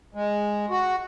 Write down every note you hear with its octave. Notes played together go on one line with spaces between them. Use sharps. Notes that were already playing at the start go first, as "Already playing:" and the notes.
G#3
F#4